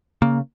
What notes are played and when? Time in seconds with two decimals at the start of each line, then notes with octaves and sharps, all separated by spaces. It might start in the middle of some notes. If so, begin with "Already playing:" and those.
0.22 C#3 A#3